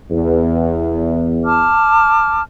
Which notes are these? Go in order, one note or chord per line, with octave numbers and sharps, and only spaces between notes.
E2
A5 D6 F6